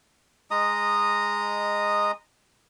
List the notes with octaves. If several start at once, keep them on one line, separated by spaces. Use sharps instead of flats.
G#3 D#5 A#5 D#6